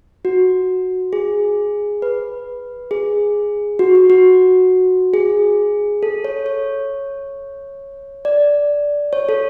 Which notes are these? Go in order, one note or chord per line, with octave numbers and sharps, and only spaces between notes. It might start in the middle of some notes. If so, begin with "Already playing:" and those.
F#4
G#4
B4
G#4
F#4
F#4
F#4
G#4
A4
C#5
C#5
D5
C#5
A4